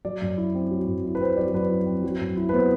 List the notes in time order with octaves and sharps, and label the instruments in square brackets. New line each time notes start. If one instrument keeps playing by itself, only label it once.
[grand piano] F#3 D5
F#2
E4
C4
F#3
F#2
E4
B4
C4 C5
F#3 D5
F#2 B4
E4
C4
F#3
F#2
E4
B4
B3 C5